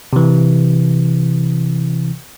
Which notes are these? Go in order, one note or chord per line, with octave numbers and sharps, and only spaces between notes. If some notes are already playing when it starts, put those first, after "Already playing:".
C3 E3